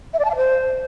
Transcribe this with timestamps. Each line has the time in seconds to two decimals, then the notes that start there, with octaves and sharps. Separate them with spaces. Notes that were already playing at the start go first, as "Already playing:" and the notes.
0.14 E5
0.19 D5
0.25 A5
0.30 F5
0.36 C5